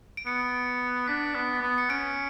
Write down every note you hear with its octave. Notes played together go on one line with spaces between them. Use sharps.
D7
B3 C#7
D4 B6
B3
B3
C#7
C#4 D7